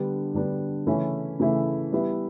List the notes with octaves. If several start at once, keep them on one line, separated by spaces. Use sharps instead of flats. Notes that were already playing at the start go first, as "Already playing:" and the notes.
Already playing: D3 G3 B3 D4
D3 G3 B3 D4
C#3 E3 A3 C#4 E4
C#3 E3 A3 C#4 E4
G3 B3 E4